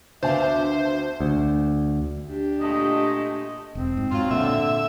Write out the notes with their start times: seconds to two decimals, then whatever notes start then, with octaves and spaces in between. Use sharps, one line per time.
0.23 D2 B3 D4 C5 E5 F5 A5
1.20 D2
2.27 D4 G4
2.60 A#2 G#3 A3 D#5
3.75 E1 C4
3.97 G#2
4.11 G#2 F#3 F4
4.31 A#2 D3 E5